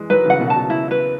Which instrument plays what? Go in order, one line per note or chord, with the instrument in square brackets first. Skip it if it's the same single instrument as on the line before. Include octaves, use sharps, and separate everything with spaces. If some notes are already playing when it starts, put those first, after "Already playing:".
Already playing: [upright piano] E3 G#3
[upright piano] D#3 F#3 [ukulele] B4
[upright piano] C#3 E3
[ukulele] F#5
[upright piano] B2 D#3
[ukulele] A5
[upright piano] B2
[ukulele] E4
B4